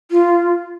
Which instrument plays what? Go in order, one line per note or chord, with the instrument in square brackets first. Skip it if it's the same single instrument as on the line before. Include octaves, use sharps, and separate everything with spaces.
[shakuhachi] F4